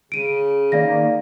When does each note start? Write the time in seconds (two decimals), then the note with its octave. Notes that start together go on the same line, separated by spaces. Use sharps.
0.12 C#3 D7 D#7
0.72 D#3 A#3 D5 F5 A#6